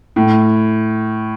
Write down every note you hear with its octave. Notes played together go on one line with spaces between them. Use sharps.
A2